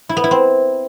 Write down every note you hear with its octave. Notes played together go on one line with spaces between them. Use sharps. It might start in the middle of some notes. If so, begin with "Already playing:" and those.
E4
B3
E4
C4